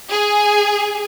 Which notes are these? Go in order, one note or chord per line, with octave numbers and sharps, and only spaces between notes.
G#4